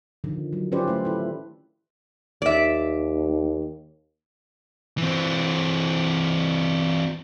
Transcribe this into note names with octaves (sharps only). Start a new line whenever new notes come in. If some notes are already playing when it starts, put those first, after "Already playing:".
D3 D#3 F3
F#3
C#4 F4 G4 B4 C5 D5
A3 E4
E4 A4
D#2 D5 E5
E3 C4